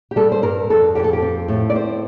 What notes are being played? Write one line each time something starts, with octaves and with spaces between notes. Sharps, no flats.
G4
G3 A4
C5
G2 A#4
F2 A4
F2 G4
A4
G4
C4
A2
D5
C4 C5